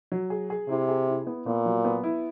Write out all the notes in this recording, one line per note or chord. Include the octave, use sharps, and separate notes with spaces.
F#3
G#4
G#4
C3 E4
G#4
E4
B3
A#2 B3
F#3
B3
E4